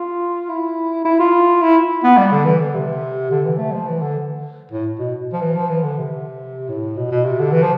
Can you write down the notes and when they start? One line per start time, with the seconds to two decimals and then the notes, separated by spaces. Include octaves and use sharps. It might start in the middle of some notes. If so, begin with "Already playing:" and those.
Already playing: F4
0.49 E4
1.05 E4
1.19 F4
1.62 E4
2.04 B3
2.17 G3
2.32 D3
2.45 E3
2.61 D3
2.74 C3
3.31 D3
3.45 E3
3.58 A3
3.72 F3
3.87 E3
4.01 D3
4.72 A2
4.99 B2
5.33 F3
5.41 E3
5.56 F3
5.69 E3
5.83 D3
5.98 C3
6.69 A2
6.97 B2
7.11 B2
7.25 C3
7.39 D3
7.52 E3
7.62 F3